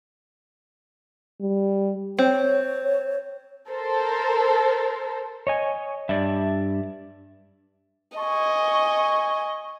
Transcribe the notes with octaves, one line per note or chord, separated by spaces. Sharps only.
G3
C4 C#5
A4 A#4 C5
C#5 D#5 G#5
G2 D5 E5
D#5 G#5 C#6